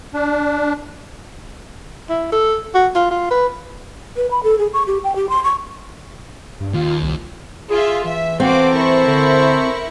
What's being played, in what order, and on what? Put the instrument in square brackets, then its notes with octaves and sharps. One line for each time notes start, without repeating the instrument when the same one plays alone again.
[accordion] D4
[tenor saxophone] E4
A4
F#4
F4
F4
B4
[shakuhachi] B4
B5
A4
G#4
C#6
G4
G5
G4
C6
C#6
[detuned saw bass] G2
[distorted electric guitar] D#2 [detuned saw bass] F4
[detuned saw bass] C2
[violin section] F4 E5 [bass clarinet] G#4
[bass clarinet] E3 [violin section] E5
[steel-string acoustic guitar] C4 [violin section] F4 F#4 D6 [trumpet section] A4 C5
[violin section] E4 A#4 C#6
[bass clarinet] D3